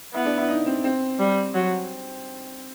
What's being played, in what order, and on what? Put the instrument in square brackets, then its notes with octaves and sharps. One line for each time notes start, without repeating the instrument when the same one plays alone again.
[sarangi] B3 [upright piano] E4
[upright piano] D4
E4
D#4
C4
C4
[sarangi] G3
F#3